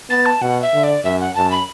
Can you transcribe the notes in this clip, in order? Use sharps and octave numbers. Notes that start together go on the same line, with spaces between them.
B3 A6
A5
B2 F#5
E5
D3
D5
F#2 E5
F#5
F#2 A5
B5